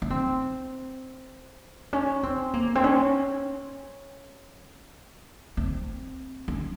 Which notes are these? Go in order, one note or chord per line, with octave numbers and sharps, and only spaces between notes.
C#4
C4
C#4
C4
A#3
C4
C#4
C4
C#4